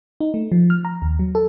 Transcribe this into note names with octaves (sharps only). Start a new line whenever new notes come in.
D#4
A3
F3
F6
A#5
D#2
F#3
A4